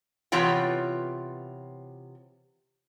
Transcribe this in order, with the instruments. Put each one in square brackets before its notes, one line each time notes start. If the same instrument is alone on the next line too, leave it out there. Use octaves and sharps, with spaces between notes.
[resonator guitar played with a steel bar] C3 E3 B3 F4 C#5 G5